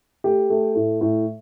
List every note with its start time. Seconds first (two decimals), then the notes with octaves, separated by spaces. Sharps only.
0.24 A3 G4
0.50 A3
0.75 A2
1.01 A2